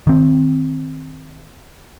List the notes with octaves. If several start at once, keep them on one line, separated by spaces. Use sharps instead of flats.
D#3 C4